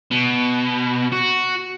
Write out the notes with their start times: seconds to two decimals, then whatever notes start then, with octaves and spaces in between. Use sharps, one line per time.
0.11 B2
1.12 F#4